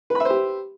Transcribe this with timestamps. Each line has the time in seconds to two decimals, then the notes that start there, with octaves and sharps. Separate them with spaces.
0.10 B4
0.15 B5
0.20 E5
0.25 C5
0.30 G4